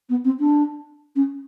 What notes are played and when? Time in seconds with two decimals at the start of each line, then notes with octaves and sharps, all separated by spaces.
0.09 B3
0.24 C4
0.39 D4
1.15 C#4